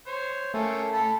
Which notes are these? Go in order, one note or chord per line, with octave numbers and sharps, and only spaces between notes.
C5 C#5
A3 A#3 C#4 A4
A4 A5 B5